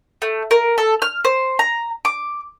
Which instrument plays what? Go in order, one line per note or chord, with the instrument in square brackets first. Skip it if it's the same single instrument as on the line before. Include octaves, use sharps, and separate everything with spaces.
[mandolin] A3
A#4
A4
F6
C5
A#5
D6